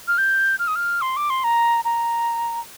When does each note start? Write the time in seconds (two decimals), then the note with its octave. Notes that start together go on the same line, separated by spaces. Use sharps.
0.08 F6
0.18 G6
0.59 F6
0.68 D#6
0.76 F6
1.02 C6
1.17 D6
1.30 C6
1.44 A#5
1.85 A#5